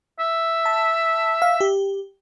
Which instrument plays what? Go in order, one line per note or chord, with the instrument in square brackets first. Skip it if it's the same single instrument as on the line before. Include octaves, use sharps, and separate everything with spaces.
[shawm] E5
[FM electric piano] A5
F5
G4